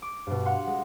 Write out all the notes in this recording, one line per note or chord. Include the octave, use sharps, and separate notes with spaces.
D6
G2 B2
F5 F#5 C6
G#3